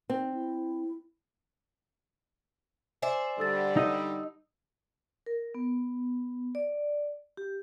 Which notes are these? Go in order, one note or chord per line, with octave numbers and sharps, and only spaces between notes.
C4 D#4
E4
C5 D5 E5 G#5
D3 G3 A4 E6 A6
D#4 D#5 D#6 E6
A#4
B3
D5
G4